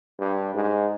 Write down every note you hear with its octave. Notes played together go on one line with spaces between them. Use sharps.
G2
G#2